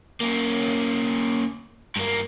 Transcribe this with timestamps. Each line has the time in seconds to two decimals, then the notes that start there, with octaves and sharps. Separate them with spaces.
0.20 A#3 C#4
1.97 G2 A#3